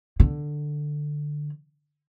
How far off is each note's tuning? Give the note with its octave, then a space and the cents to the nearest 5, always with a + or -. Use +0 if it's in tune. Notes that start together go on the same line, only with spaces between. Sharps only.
D3 +10